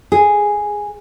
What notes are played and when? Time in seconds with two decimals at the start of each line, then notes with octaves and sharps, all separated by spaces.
0.12 G#4